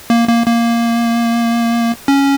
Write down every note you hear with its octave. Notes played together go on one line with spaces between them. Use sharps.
A#3
A#3
A#3
C#4